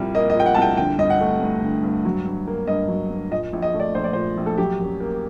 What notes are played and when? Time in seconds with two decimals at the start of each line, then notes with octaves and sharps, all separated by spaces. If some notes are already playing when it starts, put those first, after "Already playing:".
Already playing: C2 A#2 G3
0.15 A#3 D#5
0.30 D#5
0.35 A#2 G5
0.46 F#5
0.55 C2 A5
0.62 G5
0.77 D3 G5
0.99 G2 D#5
1.10 F#5
1.20 A3
1.41 G2
1.62 D3
1.83 G2
2.05 F#3
2.26 G2
2.47 A#3
2.67 G2 D#5
2.89 F#3
3.11 G2
3.31 A#2 D#5
3.53 A#1
3.62 D#5
3.74 A3
3.80 D5
3.95 A#1 C5
4.04 D5
4.13 A#2 C5
4.37 A#1
4.46 A4
4.58 F#3 G4
4.80 F#2
5.00 A#3